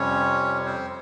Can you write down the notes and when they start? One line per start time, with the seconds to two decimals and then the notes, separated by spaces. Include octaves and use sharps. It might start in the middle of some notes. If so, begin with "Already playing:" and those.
Already playing: F2 C3 G3 C#4 C#5
0.66 C4 C5